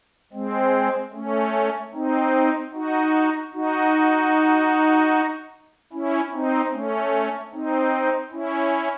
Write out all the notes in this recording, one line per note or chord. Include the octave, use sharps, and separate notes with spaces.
G#3 C4
A3 C#4
C4 D#4
D#4 F#4
D#4 F#4
C#4 E4
C4 D#4
A3 C#4
C4 D#4
C#4 E4